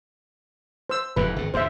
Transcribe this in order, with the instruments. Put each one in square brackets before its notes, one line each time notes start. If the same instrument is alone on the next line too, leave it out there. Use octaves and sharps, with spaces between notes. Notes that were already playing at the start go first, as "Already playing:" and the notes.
[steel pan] C5 E6
[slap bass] F1 E2 G#2 [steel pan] B4
[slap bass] G#1 A2
[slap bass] D2 G2 [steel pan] C5 E5